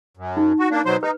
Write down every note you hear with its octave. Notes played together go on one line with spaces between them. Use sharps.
F#2
D#4
F#4
A#3 D4
B2 F#3 C5
D#4 B4